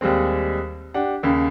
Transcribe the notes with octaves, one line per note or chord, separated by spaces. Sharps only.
D#2 G3 G#3 C4
D4 G4 F#5
D#2 C#3